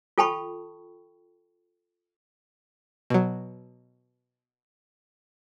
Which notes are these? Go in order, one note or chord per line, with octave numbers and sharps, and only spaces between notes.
F4 A4 G5 A5 B5 C#6
B2 F#3